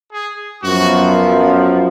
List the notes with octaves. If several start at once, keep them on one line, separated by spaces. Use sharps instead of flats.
G#4
F#2 F3 B3 F#4